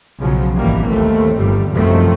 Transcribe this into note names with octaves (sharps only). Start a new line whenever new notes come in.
B1 C#3 F3 F#3
G#1 E3 G3 A#3
D#2 A3 C4
G1 G2 G3
F#2 C3 D#3 F3 A3 C4